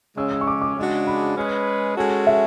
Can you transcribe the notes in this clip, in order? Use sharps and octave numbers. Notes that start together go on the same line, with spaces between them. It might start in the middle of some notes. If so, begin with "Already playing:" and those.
C#3 G#3 C#4 E6
E6
C#6
D6
D6
C#3 G#3 D4 F#4
B5
G#3 C#4 G#4 B4
G#3 C#4 F#4 A4
E5